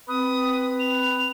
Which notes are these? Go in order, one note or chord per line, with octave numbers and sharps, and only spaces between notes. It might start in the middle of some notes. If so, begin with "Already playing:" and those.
C4 B4 D#6
F7